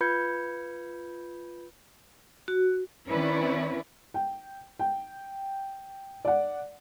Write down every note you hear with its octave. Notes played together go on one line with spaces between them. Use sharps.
F4 B4 B5 G6 G#6 C#7
F#4
D#3 C4 C#4 E4 B4 D5
G5
G5
D5 F#5